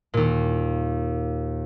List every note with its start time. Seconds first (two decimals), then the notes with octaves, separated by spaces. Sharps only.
0.14 D#2 A#2